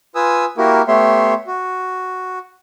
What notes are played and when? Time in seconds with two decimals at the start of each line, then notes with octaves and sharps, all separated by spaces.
0.15 F4 B4 G#5 D#6 E6
0.58 A#3 E4 F#4 G4 A#4
0.88 A3 B3 G4 C#5 E5 C6
1.47 F#4